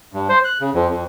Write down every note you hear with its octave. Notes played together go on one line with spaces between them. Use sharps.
G2
C5
F#6
C#3
F2
F2